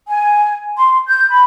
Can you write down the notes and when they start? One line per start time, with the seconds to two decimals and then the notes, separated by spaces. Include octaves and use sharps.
0.06 G#5
0.77 C6
1.07 G6
1.30 B5